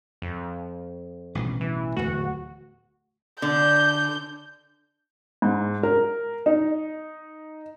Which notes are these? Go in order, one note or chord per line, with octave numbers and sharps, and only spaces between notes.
F2
A1 G2 B2
E3
D1 E2 A3 F#4
D3 G6
G#2
A#4
D#4